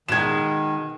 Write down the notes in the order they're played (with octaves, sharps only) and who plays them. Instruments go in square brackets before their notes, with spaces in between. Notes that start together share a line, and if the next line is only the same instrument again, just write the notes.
[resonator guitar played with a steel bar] B2 G#3 [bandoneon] D#3 [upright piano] G#6 E7